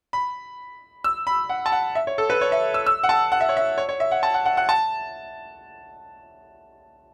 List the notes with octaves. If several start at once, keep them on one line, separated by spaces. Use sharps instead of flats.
B5
E6
B5
F#5
A5
F#5
E5
C#5
A4
B4
C#5
E5
E6
E6
F#5
A5
F#5
E5
C#5
E5
C#5
C#5
E5
F#5
A5
F#5
F#5
F#5
A5